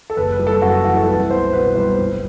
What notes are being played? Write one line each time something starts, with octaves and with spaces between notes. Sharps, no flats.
A4
F#1 B4
B4
G3
A4
F#2 F#4
E3 F#4
A4
C2 B4
B3 C5
B2 B4
G3 C5
G1